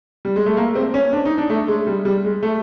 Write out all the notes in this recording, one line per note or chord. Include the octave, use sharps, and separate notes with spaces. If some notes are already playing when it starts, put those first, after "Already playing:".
G3
G#3
A3
A#3
C4
C#4
D4
D#4
D4
A3
G#3
G3
G3
G#3
A3